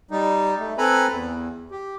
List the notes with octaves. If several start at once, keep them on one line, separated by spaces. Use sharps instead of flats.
G3 D#4
A3
C4 A4 B4 G#5 A#5 B5
E2
G4